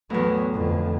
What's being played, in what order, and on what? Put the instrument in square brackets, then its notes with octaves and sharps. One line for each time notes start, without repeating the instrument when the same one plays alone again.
[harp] E2 A2 [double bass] F#3 B3
[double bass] F2 D3